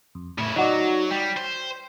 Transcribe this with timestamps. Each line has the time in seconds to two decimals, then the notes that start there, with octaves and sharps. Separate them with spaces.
0.15 F2
0.38 A2 C#3 E4
0.56 F#3 D#4 F#4 D5
1.11 G3 G5
1.37 C5